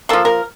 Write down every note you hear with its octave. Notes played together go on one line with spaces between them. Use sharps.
F3 A#3 A4
A#4